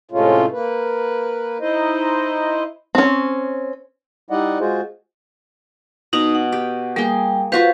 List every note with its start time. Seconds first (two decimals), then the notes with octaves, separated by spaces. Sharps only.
0.11 A2 C3 G#3 A3 C#4 F4
0.52 A#3 B4
1.60 D#4 E4 C5 D#5
2.95 C4 C#4
4.30 G3 D#4 E4 D5 D#5 F#5
4.60 G#3 F4 F#4 G#4 C5
6.13 B2 D#4 A#5
6.35 F#5
6.52 G4
6.96 G3 A#3 G#4 G5
7.52 F4 F#4 B4 C5 F5